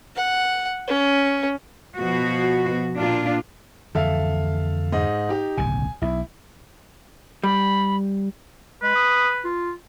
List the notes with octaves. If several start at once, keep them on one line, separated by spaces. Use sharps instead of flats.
F#5
C#4
B2 F3 F#4
A#2 A#3 D4 F4
F2 D3 E3 A4 E5 F5
G#2 D#5
D#4 G4
D1 B1 C#3 G#5
B1 E4
G3 B5
G#3 B4
D#6
F4